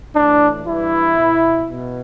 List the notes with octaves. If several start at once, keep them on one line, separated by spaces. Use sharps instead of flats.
A2 E3 D4
G2 E3 E4
B2
B2